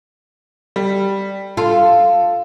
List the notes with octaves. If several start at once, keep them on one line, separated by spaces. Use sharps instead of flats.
G3
F4 A4